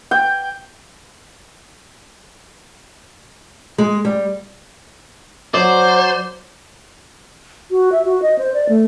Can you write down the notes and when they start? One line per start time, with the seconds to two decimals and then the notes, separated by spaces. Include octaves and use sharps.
0.11 G5
3.78 G#3
4.05 G3
5.54 F#3 C5 D5
7.71 F#4
7.92 E5
8.05 F#4
8.22 D#5
8.38 C5
8.54 D5
8.69 A3